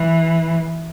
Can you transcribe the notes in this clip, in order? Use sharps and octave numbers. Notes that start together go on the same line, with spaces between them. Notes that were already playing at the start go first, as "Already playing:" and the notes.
Already playing: E3